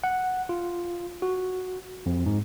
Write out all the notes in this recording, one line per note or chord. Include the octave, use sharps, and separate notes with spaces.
F#5
F4
F#4
F2
G#2